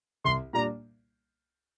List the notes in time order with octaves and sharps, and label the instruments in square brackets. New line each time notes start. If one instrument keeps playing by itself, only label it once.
[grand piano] C2 [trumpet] C6
[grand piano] A#2 G3 A#3 D4 [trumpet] A#5